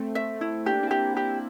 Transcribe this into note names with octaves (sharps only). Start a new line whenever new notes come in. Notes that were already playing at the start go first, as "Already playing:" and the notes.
Already playing: A3 C4
E5
E4
A#3 D4 G4
C4 E4
G4
C4 E4 G4